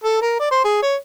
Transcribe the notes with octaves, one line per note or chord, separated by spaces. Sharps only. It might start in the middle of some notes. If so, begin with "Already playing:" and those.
A4
A#4
D5
C5
G#4
C#5